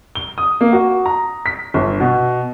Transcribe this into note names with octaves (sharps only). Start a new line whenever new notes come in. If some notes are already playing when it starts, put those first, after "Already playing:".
G7
D#6
A#3
F#4
A#5
B6
G1
B2